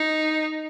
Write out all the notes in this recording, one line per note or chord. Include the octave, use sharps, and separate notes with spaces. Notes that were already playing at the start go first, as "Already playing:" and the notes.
Already playing: D#4